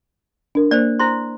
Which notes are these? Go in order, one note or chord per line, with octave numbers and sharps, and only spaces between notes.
D4 A#4
A#3 C5 D5
E4 C5 C6